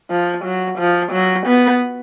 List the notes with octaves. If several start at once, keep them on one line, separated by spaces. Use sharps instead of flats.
F3
F#3
F3
F#3
B3